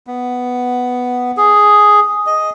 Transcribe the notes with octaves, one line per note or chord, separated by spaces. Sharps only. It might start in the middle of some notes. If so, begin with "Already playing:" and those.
B3
G#4
D#5